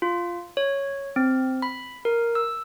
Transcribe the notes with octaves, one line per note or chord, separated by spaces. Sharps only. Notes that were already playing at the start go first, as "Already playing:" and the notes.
F4
C#5
C4
B5
A#4
E6